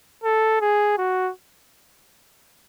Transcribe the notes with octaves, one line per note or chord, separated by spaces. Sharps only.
A4
G#4
F#4